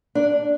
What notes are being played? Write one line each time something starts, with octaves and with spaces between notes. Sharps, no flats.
D4